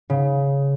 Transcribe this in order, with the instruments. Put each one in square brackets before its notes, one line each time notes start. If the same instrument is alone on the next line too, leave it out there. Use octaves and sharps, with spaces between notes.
[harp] C#3